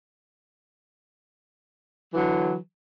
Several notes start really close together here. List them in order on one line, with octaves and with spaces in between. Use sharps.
F#3 E3 D3